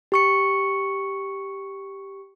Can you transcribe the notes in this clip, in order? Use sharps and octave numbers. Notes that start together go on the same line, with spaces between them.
G4 C#6 C#7